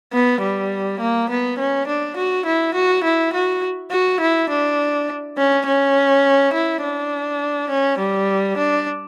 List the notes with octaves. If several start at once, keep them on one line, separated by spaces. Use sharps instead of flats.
B3
G3
A#3
B3
C#4
D4
F#4
E4
F#4
E4
F#4
F#4
E4
D4
C#4
C#4
E4
D4
C#4
G3
D4